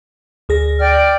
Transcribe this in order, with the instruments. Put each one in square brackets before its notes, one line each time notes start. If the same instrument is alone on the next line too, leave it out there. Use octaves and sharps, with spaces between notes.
[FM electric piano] D2 G#4 A#6
[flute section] D5 G5 F6